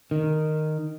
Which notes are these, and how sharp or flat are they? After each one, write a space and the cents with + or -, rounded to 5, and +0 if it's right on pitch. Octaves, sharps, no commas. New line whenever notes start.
D#3 -10